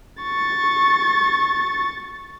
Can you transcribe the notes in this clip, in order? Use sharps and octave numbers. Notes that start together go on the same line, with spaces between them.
C#6 A6